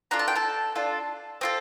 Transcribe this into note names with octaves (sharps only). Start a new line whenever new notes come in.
D4 F4 A4 A#5
A5
G5
A4 A5
D4 F4 A4
C4 F4 A4